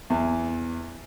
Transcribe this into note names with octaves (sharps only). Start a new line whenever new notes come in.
E2